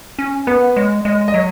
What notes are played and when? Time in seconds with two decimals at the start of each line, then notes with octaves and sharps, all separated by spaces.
0.19 C#4
0.47 B3 B4
0.76 G#3 C#5
1.05 G#3 D#5
1.28 D#5
1.34 F#3 C#5